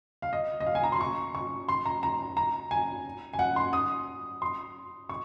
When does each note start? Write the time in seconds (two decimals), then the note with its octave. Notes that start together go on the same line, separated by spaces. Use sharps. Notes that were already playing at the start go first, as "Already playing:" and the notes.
0.22 F5
0.33 D#5
0.60 D#5
0.66 F5
0.75 G#5
0.84 A#5
0.92 C6
1.01 C#6
1.35 C#6
1.69 C6
1.86 A#5
2.03 A#5
2.37 A#5
2.71 G#5
3.33 G#5
3.39 F#5
3.56 C6
3.73 D#6
4.42 C6
5.09 C#6